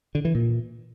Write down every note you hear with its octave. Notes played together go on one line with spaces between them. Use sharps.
D3
E3
A#2